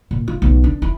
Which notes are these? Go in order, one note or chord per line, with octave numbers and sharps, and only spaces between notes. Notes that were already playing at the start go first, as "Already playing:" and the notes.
A#2
F4
B1
D4
E4